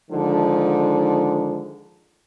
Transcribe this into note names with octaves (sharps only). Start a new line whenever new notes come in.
D3 D#3 F3 G#3 D#4